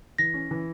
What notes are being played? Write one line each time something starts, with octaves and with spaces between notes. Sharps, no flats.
E3 A#6
C#4
E3